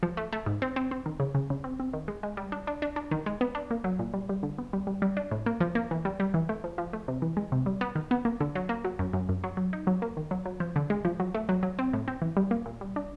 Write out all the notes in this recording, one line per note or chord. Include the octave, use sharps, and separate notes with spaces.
F3
A3
A3
G#2
C4
C4
C4
D#3
C#3
C#3
C#3
C4
C4
D#3
G#3
G#3
G3
D4
D4
D4
D4
D#3
G#3
B3
D4
A#3
F#3
A#2
G3
G3
D3
B3
G3
G3
G3
D4
A2
A#3
F3
A#3
E3
G3
G3
E3
A3
F3
F3
A3
C3
E3
G#3
C3
G3
B3
D#3
B3
A#3
D3
F#3
A#3
F#3
F#2
F#2
F#2
F#3
F#3
D#4
F#3
A#3
D#3
F#3
F#3
F3
D3
G#3
F3
F#3
A3
F#3
F#3
C4
A2
C4
E3
G3
A#3
A#2
G3
D4